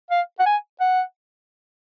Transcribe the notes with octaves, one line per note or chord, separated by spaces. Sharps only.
F5
F#5
G#5
F#5